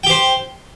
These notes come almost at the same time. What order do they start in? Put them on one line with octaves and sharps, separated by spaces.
G5 G4 C5